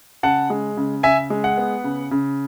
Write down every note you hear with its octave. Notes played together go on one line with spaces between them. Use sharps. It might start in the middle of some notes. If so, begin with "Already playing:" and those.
C#3 F#5 A5
G#3
C#3
C#3 E5 G#5
G#3
F#5
B3
C#3
C#3